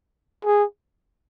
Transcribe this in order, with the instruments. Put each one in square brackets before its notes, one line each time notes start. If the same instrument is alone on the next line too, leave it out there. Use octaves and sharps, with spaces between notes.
[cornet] G#4